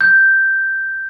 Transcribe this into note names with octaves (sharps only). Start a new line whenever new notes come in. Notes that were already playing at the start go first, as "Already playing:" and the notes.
G6